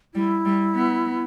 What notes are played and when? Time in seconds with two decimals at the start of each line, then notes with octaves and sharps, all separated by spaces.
0.14 G3 E4
0.45 G3
0.75 B3